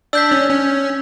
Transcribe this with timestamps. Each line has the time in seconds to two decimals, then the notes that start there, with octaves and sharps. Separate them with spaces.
0.13 D4 E6 G6 B6
0.32 C#4
0.50 C#4